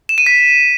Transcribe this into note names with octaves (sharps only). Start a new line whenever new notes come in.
E7
D#7
B6